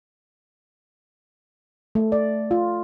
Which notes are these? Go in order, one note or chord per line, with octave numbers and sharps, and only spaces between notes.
A3
D5
F4